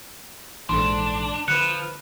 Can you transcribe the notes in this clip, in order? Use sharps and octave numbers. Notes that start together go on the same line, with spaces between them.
A#1 G#2 E3 D4 A4 C6
D3 F3 B4 B5 F6 F#6 C#7